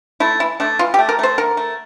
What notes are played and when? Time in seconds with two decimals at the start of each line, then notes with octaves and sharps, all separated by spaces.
0.20 A3 E4
0.40 E3 E4
0.60 A3 D4
0.79 E3 F4
0.94 G4
0.99 A3
1.09 A#4
1.19 A3 C5
1.38 D3 A#4
1.57 A3